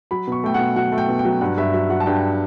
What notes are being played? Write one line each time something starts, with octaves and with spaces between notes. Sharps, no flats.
F#3 B5
B2 C#6
A3 G5
B2 F#5
F#3 F#5
A3
G5
B2
G5
F#3
G2 F#5
G2 E5
F#3 E5
F#3 F#5
A5
G2 G5